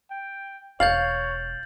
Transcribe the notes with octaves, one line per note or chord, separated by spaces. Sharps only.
G5
E1 C#5 F5 G6 A6 F#7